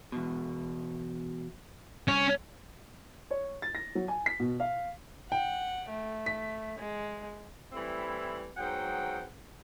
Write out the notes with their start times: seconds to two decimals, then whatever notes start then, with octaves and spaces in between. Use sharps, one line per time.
0.12 E2 B2
2.08 C2 C#4
3.31 C#5
3.62 A6
3.75 A#6
3.95 F#3
4.08 G#5
4.26 B6
4.40 B2
4.60 F5
5.32 F#5 G5
5.89 A3
6.26 B6
6.79 G#3
7.73 E3 G3 A3 C4 E4
8.57 G#2 F#3 B3 F#5 G5